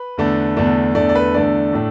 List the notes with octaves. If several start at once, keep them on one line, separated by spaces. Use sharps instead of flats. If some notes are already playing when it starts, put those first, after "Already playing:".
Already playing: B4
E2 D3 A3 D4
E2 D3 A3 D4
E2 D3 A3 D4 D5
D5
B4
E2 D3 A3 D4 D5
A2 A3 D4